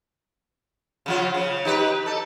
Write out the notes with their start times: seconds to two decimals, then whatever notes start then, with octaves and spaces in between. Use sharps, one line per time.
1.06 C#3 F3 F4
1.34 C#3
1.65 D#4 G4 B4
2.06 A4